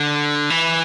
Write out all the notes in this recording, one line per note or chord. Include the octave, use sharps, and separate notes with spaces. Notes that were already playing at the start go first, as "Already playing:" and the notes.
Already playing: D3
E3